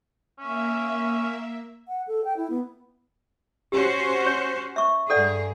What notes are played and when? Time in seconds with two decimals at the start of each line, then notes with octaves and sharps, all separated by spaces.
0.38 A#3 C#4 E5
1.88 F#5
2.08 A4
2.25 G5
2.37 E4
2.50 B3
3.72 C#4 F#4 G4 C5
4.26 C#5
4.76 E5 C#6
5.10 G2 G#4 A4 D5 F#5